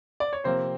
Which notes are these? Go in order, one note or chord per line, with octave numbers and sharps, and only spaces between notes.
D5
C#5
C3 F3 A#3 C4 C5